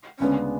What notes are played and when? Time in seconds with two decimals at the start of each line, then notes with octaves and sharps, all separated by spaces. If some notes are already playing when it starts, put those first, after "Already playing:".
0.19 D2 C#3 G#3 B3 C#4 D4